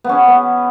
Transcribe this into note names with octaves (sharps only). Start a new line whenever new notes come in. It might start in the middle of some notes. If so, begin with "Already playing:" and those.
B3 C#4
B3